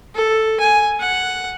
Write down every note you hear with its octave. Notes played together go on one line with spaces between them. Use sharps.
A4
G#5
F#5